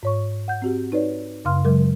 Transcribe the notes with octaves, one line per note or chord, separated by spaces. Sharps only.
G#2 C#5 C#6
F#5 G6
C4 F#4 G4
D#4 B4 C#5 D5
F#2 C#3 F5 C6 F6
C#3 F#3 G#3 A#4